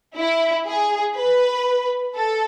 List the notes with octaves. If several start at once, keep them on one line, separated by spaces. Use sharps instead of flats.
E4
G#4
B4
A4